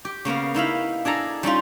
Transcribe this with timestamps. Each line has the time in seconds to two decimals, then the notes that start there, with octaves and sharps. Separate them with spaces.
0.05 G4
0.25 C#3 A#3 B3 F5
0.54 D#4 E4 F5 B5
1.05 D4 G#4 A4 A#5
1.43 G3 C#4 D#4 F4